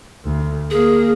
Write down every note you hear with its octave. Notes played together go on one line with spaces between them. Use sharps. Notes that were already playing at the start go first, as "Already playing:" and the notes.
D2
A#3 G#4